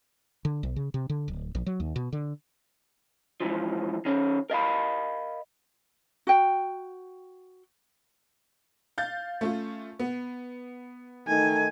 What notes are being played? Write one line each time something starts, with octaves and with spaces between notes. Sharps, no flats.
D3
B1
C#3
C3
D3
D1
A#1
F#3
D#2
B2
D3
G#2 B2 E3 F3
D#3 C#4
A#4 D#5 F5 B5
F#4 G5
F5 G6 A6
A3 C#4 F4
B3
D#3 A3 D#4 G#5